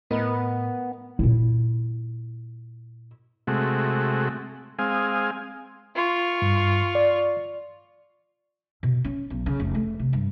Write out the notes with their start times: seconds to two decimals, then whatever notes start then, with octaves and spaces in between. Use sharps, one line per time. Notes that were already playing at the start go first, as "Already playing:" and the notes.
0.11 A2 B3 A#4 B4 D#5
1.19 A#2 E4
3.47 C3 G#3 A3 F#4
4.79 G#3 C4 F5 G#5 D#6
5.95 F4 C#6
6.42 G2
6.95 D5
8.83 B2
9.04 C#4
9.30 B1
9.46 C#3
9.60 F1
9.75 A3
9.99 C3
10.13 G2